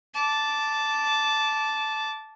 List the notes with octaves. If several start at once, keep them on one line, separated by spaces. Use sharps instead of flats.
A5 D6